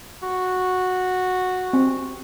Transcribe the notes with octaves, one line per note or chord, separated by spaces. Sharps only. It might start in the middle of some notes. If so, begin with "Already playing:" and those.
F#4
C4